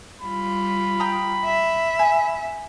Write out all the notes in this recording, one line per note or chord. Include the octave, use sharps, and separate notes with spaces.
G3 F4 B5
G5 A#5 D#6
E5
G#5